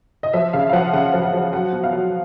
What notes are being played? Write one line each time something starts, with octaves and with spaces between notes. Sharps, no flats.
D#5
F3 E5
C#3 F5
F5
F3 F#5
C#3 F#5
F3
F#5
F3
F#3 F#5
B2
F5
F#3